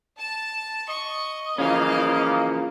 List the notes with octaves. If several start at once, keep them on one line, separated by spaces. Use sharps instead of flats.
A5
D#5 C#6
C#3 E3 F3 A#3 C#4 F5